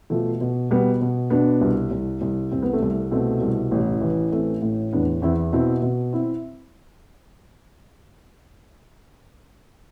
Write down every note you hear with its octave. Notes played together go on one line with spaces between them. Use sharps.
B2 F3 A3
B2
B2 G3 B3
B2
B2 B3 D4
C2
C2
C2
C2 C4
B3
A3 C4
C2
B2 A3 C4
C2
A1
E3
A1 A3 C4
A2
E2 B3 D4
E2 C4 E4
B2 C4 E4
B2
C4 E4